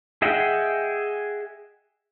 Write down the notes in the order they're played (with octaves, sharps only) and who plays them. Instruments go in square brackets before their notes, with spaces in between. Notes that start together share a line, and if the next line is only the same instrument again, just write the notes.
[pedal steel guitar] G#4 D#5 E5 F#5 G5